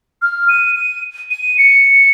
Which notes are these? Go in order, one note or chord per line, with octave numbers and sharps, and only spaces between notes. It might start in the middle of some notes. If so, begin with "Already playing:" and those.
F6
D#7
D#7
D#7
C#7